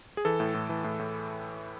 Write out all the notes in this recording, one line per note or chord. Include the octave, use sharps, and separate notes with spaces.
G#4
E3 A4
A2
A2
E3
A2
A2